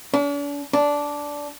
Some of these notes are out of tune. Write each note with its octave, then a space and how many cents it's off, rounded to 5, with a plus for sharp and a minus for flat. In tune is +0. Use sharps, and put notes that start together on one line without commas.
D4 -45
D4 -10